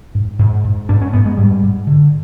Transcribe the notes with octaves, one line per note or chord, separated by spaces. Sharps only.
G#2
G#2
G#2
G#2 D4
C#4
G#2 B3
G#3
G#2 G3
G#2
D3